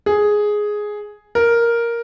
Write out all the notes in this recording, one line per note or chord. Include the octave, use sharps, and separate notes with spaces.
G#4
A#4